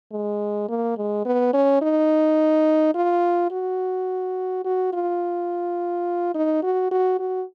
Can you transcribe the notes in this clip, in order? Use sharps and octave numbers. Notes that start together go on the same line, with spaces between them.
G#3
A#3
G#3
B3
C#4
D#4
F4
F#4
F#4
F4
D#4
F#4
F#4
F#4